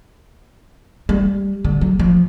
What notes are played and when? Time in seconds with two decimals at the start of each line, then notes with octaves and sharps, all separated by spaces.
1.09 G3
1.65 D3
1.81 F#3
1.99 F3